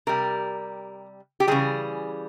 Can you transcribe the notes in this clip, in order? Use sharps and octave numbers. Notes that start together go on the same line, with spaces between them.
C3 G3 A#4
G4
C#3 E3 G3 G#4